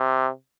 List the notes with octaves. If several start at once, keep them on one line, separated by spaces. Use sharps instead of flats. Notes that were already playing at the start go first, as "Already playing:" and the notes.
Already playing: C3